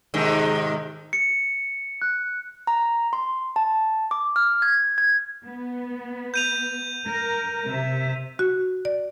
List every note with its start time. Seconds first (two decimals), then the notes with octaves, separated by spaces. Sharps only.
0.14 G#2 C3 D#3
1.13 C#7
2.02 F#6
2.67 A#5
3.13 C6
3.56 A5
4.11 D6
4.36 F6
4.62 G#6
4.98 G#6
5.44 B3
6.34 G6 D#7 F7
7.05 A#4
7.68 C3 E5
8.39 F#4
8.85 D5